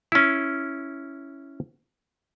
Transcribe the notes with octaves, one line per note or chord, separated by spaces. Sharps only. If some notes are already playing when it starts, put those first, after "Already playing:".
C#4 E4